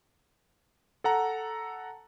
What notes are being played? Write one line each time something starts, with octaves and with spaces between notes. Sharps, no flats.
A4 F#5 A#5